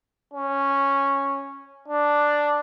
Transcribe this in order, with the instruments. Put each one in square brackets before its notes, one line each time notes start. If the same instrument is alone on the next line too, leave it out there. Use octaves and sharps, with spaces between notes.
[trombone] C#4
D4